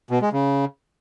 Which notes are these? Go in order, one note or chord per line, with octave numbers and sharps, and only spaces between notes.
B2
G#3
C#3